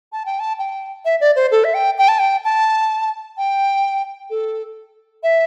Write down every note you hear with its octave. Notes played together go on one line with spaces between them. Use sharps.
A5
G5
A5
G5
E5
D5
C5
A4
E5
G5
G5
A5
G5
A5
G5
A4
E5